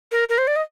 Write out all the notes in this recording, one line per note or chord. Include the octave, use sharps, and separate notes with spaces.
A#4
A#4
C5
D5
D#5